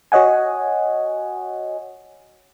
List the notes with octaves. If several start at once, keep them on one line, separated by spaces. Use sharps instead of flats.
F#4 C#5 D#5 F#5 G#5